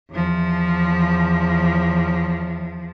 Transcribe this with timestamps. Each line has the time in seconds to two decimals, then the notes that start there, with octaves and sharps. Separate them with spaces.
0.10 E2 F3